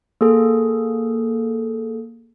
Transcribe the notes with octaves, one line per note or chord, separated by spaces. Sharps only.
A#3 G#4 A4